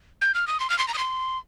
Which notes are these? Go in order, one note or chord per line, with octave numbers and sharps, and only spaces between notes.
G6
F6
D#6
C6
F6
C6
A#5
D#6
C6